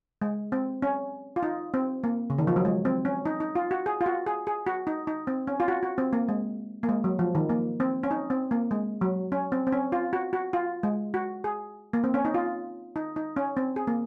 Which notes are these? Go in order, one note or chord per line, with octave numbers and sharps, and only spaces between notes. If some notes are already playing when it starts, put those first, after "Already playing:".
G#3
C4
C#4
F4
D#4
C4
A#3
C#3
D#3
F3
F#3
G#3
C4
C#4
D#4
D#4
F4
F#4
G#4
F4
F#4
G#4
G#4
F#4
D#4
D#4
C4
C#4
F4
F#4
F#4
C4
A#3
G#3
A#3
G#3
F#3
F3
D#3
A#3
C4
C#4
D#4
C4
A#3
G#3
F#3
C#4
C4
C4
C#4
F4
F#4
F#4
F4
G#3
F#4
G#4
A#3
C4
C#4
D#4
F4
D#4
D#4
C#4
C4
G#4
A#3